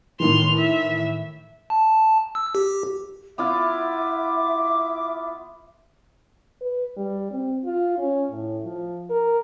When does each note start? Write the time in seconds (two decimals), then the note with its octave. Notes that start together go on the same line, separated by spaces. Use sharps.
0.20 A2 D#3 E3 C6 F7
0.58 E5
1.70 A5
2.35 E6
2.55 G4
3.38 B3 E4 F4 E5 D6
6.61 B4
6.97 G3
7.31 C4
7.64 F4
7.98 C#4
8.31 A2
8.64 F3
9.10 A#4